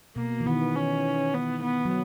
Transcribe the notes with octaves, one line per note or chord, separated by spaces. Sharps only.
B2 A#3
E3
D#3 B3
C#4
B3
B3
F#3